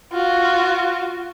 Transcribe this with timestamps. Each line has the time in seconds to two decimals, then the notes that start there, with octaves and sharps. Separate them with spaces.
0.12 F4 F#4